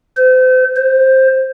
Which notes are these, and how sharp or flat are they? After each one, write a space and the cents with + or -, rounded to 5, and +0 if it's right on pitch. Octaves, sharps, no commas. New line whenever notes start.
C5 -40
C5 +10